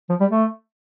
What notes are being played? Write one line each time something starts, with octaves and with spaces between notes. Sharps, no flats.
F3
G3
A3